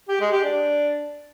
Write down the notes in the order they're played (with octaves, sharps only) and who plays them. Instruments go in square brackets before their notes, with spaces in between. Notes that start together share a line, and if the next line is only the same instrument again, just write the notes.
[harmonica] G4
G#3
G4
D4